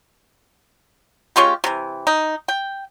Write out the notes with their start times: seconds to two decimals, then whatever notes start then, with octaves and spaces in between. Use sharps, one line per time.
1.36 G#3 C#4 F4 G4
1.64 C3 E3
2.07 D#4
2.48 G5